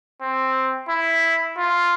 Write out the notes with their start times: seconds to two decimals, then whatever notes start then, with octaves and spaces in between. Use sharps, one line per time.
0.22 C4
0.89 E4
1.57 F4